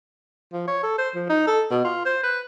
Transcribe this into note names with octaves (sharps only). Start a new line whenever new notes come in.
F3
C#5
A4
C5
F3
D#4
A4
B2
F4
C5
B4